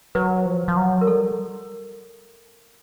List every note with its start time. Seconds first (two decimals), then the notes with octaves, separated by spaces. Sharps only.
0.15 F#3 B4
0.46 F3
0.68 F3
0.77 F#3
1.01 A#4
1.07 G3 A4